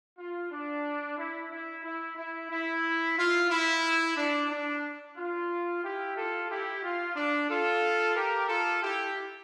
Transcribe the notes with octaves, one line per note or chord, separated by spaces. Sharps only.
F4
D4
E4
E4
E4
E4
E4
F4
E4
D4
D4
F4
E4 G4
F4 A4
E4 G4
F4
D4
F4 A4
G4 A#4
F4 A4
E4 G4